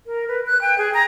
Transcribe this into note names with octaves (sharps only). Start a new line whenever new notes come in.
A#4
B4
F#6
G5
G#4
A#5